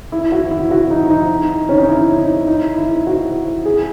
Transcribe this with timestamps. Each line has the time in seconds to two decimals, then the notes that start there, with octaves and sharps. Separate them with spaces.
0.12 E4
0.32 F#4
0.51 E4
0.71 F#4
0.91 D#4
1.10 D#4
1.69 C#4
1.78 D#4
1.89 E4
2.18 D#4
2.47 D#4
2.77 E4
3.07 F#4
3.65 G#4